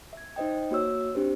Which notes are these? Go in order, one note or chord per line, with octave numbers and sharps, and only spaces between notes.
E5 G#6
D#4 C5 D#5 G5
A#3 F#4 C#5 E6
C4 D4 G4 C5